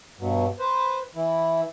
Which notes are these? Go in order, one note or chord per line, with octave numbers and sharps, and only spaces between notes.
G2 B2 F#3
B4 C5
E3 E4